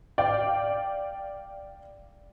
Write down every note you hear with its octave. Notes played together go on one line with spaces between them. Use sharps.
D5 F5 G5